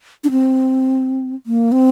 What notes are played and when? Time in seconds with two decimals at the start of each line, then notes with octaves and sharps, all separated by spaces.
0.24 D4
0.31 C4
1.47 A#3
1.72 C4